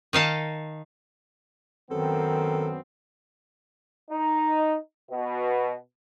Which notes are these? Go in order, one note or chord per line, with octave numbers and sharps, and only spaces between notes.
D#3 D#4 F5 A5
F#2 D#3 B3 C4 A4
D#4
B2